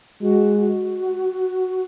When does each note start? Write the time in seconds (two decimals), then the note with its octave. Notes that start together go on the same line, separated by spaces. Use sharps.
0.22 G#3 F#4
0.60 F#4